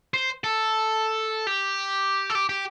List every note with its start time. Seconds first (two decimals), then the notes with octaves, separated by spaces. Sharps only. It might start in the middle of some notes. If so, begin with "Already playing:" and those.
0.14 C5
0.44 A4
1.47 G4
2.30 A4
2.35 G4
2.49 G4